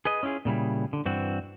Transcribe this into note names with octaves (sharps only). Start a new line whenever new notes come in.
G#4 B4 D#5
C#4 E4 F4 G4 G#4
A#2 C#3 G3 E4
D3
G2 E3 C4 F#4